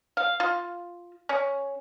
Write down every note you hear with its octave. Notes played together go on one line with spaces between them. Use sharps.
F5
F4
C#4